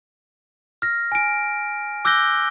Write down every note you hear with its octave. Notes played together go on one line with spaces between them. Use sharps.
F6 A#6
G#5 D7
D6 E6 F#6 G6 A#6 G7